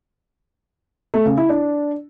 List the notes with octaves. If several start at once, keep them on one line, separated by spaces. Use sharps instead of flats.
A3
C#3
E4
D4